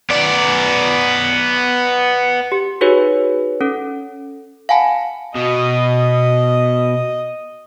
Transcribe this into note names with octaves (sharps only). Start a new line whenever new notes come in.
B3 D5
G4
D#4 F#4 G#4 B4 C#5
C#4 A4
F5 F#5 G#5 A5 B5
B2 D#5